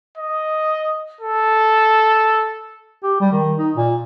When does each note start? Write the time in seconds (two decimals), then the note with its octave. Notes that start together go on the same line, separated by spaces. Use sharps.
0.18 D#5
1.21 A4
3.04 G4
3.21 G3
3.32 D#3
3.58 D#4
3.76 A#2